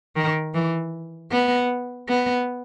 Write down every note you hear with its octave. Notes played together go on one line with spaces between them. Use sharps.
D#3
E3
B3
B3